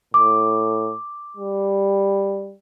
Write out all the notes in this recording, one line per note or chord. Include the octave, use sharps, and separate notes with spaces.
A2 D6
G3